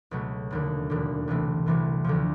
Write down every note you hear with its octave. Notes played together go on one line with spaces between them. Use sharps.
C#2 B2 F#3 A3 C#4
E1 D#2 D3
E1 D#2 D3
C2 C3 E3 A3
C2 C3 E3 A3
D2 D3 F3